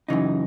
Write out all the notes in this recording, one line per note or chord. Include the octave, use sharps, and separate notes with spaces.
F#2 C#3 E3 D#4